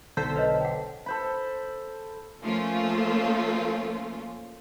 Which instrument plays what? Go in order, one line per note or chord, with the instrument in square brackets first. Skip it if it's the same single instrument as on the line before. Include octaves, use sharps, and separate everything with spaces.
[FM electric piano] B1 A4 B6 [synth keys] D3 C5
[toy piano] B4 C#5 D#5
F#5 G5
[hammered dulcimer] A4 C5 B5
[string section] F3 A3 A#3 C#4 F4